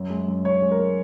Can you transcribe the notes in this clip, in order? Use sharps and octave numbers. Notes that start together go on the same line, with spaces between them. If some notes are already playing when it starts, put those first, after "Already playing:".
Already playing: F#2
G#3
F#2
F#2 C#5
G#3
A#4
G#3